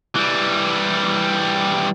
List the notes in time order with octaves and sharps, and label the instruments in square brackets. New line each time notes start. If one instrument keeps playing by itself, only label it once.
[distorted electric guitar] E3 G3